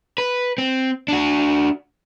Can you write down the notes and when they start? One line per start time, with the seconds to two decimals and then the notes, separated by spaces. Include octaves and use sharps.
0.18 B4
0.58 C4
1.08 D4 F#4